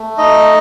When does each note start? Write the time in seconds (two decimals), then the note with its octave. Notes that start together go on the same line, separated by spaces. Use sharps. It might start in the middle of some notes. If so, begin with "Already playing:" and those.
Already playing: A3
0.18 D#4 D#5